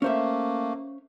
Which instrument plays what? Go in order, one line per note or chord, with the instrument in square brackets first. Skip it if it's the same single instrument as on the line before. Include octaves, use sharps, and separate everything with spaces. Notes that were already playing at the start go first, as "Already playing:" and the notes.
[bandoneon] A3 A#3 [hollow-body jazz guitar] C#4 C5 E5